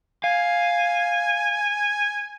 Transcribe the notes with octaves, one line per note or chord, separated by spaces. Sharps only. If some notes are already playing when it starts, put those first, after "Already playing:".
F5 G#5